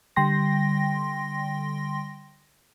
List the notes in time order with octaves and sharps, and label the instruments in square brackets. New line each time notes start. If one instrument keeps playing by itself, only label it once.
[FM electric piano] D3 G3 G5 C6 A#6